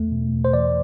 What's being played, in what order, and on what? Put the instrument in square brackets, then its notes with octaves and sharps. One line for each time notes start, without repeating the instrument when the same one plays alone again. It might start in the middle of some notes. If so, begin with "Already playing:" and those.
Already playing: [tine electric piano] E2 A3
B2
E2
C5
E3 D5